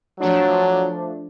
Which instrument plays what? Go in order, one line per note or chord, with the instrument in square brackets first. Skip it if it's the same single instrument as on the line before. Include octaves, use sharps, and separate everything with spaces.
[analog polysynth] F3 A3 D4 [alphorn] F#3